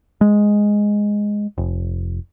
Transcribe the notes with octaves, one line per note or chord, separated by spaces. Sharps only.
G#3
F1